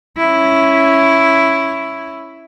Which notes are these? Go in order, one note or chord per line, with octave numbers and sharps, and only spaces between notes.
C#4 E4